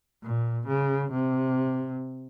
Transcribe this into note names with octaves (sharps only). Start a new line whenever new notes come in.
A#2
C#3
C3